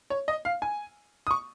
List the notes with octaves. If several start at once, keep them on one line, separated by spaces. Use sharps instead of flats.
C#5
D#5
F5
G#5
D#6
C#6